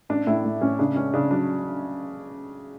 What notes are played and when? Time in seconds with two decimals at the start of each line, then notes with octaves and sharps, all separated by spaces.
0.09 A1 D4
0.27 A2 E4
0.45 A2
0.61 A1 C#4
0.79 C#3 D4
0.96 C#2 C#4
1.14 C#3 D4
1.31 F#3 D4